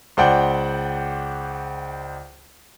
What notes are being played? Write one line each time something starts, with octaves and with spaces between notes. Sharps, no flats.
C#2 C5 D5 F#5 G5